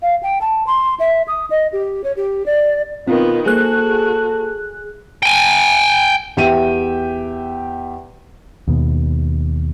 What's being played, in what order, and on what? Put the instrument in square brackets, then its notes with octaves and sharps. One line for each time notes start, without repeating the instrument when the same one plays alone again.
[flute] F5
G5
A5
C6
E5
D#6
D#5
G4
C#5
G4
D5
[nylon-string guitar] B2 [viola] D#3 B3 [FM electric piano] C4 [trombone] F4
[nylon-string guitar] A#3 C5 [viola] F#4 [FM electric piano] G#4 F#6 [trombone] A4
[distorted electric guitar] G5 G#5
[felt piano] E2 G4 E5 G5 D#7
[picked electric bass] D#2 B2